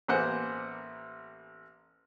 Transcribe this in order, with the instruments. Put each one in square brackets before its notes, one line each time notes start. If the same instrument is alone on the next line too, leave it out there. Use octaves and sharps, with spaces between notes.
[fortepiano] A1 A#3 B3 G#4 C5 F#5